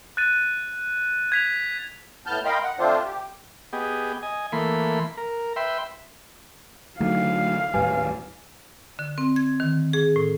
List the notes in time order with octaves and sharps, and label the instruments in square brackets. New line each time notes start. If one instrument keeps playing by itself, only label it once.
[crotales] F#6 A6 D#7
G#6 B6 F7
[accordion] A2 B3 A5 F6 G6
A#4 D#5 F5 G5 B5 C6
F#5
D3 A3 C4 D4 F4 C5
G4
[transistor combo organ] B3 G4 G#4 D#5
D#5 G#5
E3 A3 A#3 B5 C6
A#4
B4 E5 G5 C6
[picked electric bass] D3 F#3 [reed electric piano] A3 D#4 [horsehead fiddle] F5
[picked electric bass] D#2 A2 G3 [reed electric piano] B4 G#5
[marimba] D3
C4
G#6
D#3
G#4
A2